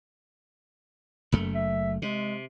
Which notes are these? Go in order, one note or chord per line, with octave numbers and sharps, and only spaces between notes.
F#1 F#2 A3
E5
C3 G#3